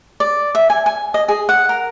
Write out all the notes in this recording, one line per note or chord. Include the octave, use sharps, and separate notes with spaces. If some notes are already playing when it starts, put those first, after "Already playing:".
D5
E5
G#5
G#5
D#5
G#4
F#5
A#4